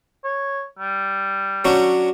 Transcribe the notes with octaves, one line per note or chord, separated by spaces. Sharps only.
C#5
G3
F#3 C#4 D4